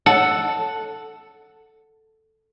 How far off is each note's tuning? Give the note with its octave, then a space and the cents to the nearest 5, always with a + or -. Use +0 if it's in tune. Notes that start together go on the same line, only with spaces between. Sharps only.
A4 +0 F#5 +0